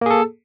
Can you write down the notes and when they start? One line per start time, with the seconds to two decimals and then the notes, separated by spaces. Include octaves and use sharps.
0.01 A#3
0.06 G#4
0.11 A4